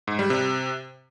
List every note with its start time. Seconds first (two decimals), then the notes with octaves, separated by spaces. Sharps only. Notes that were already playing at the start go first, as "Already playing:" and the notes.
0.07 G#2
0.19 G3
0.30 C3